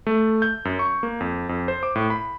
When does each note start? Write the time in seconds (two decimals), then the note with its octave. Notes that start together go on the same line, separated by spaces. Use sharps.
0.07 A3
0.42 G6
0.65 F#2
0.79 C#6
1.03 A#3
1.20 F2
1.49 F2
1.68 C5
1.83 D6
1.95 A2
2.10 B5